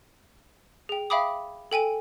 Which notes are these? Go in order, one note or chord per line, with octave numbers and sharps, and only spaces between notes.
G#4 G5
E5 F5 G5 B5 D6 D#6
A4 G5 G#5 D#7